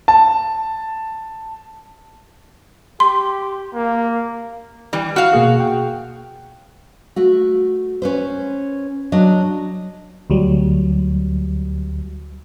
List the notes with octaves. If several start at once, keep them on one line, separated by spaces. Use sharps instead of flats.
A5
G4 C6
A#3
E3 G3
F#4 F5 F#5 F6
B2 A#3 G#4
G5
A3 F#4
C#4 B4 C5
F#3 D4 D#5
D2 F#3 G3